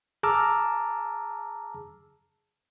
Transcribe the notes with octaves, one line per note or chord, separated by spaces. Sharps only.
G#4 A5 A#5 D6 E6 F6